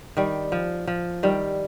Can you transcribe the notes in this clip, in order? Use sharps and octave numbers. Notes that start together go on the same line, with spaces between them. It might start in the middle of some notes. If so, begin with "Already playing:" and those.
D#3 G3
F3
F3
D#3 G3